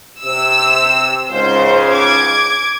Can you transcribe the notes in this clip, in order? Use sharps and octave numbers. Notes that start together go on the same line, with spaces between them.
C3 E6
C#2 G#2 C#3 C5
D6 G#6